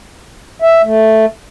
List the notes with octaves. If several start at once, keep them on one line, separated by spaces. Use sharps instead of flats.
E5
A3